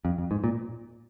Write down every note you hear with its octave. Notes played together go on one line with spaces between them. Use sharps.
F2
F2
G#2
A#2